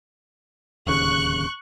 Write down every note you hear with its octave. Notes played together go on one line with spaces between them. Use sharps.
D1 D#2 C#3 C#6 F#6